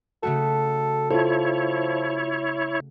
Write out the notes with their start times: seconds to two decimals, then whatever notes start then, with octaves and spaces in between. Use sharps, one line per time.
0.23 C#3 A3 F#4 A4
1.11 F3 E4 F4 A4 C#5